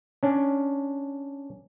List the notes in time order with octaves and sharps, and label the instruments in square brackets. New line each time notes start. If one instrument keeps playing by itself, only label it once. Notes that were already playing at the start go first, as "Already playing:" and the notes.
[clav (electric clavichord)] C#4 D4